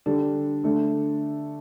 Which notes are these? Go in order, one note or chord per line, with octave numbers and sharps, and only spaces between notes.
D3 G3 D4 A4
D3 A3 D4 A4